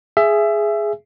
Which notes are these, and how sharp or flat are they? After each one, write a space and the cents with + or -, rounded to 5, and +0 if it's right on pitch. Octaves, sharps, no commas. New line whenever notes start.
G#4 +5 E5 +20